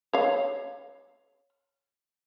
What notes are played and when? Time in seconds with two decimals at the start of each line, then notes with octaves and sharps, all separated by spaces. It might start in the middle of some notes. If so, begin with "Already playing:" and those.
0.13 C#5 F5